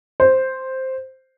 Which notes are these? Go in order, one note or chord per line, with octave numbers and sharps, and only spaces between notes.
C5